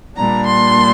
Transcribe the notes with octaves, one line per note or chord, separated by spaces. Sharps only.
A#2 G3 A#3 D4 A#5
C6